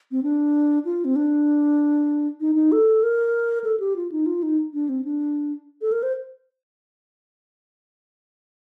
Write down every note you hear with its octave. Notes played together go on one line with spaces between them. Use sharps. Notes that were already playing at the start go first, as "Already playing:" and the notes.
C4
D4
F4
C4
D4
D#4
D#4
A4
A#4
A4
G4
F4
D#4
F4
D#4
D4
C4
D4
A4
A#4
C5